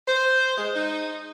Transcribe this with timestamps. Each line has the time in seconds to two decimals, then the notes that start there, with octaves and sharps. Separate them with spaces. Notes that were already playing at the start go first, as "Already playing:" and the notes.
0.07 C5
0.57 G#3
0.75 D#4